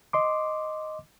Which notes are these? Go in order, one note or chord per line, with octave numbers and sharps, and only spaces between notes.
D#5 C6 D6